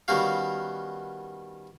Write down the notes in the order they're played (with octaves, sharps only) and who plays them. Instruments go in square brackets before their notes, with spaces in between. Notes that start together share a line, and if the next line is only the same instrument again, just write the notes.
[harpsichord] D#3 G3 B3 C#4 F#4 F5